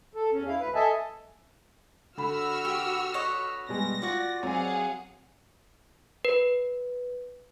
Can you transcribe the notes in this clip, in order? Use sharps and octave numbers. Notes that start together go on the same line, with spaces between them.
A4
E2 C#4
E4 F5
D2 B4
A4 D#5 E5 G#5 A5
D3 F#4 B5 E6 F6
G4
B4 C#5 D#5
B2 G3 G#3 A#6
F4 F#4 D5
F#3 C4 G#4 C#5 F5 F#5
B4